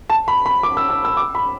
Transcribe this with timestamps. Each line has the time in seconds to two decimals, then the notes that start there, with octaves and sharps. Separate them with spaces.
0.10 A5
0.28 B5
0.46 B5
0.63 D6
0.77 E6
0.90 E6
1.05 E6
1.17 D6
1.35 B5